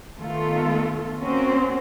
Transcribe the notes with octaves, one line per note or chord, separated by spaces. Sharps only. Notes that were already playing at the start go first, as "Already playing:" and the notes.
D#3 A3 B3 F4 A4
A#3 C4 C#4 F#4